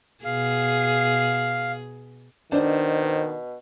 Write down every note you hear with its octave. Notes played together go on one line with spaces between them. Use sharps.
B2 G#4 F5
B2 D#3 D4 C5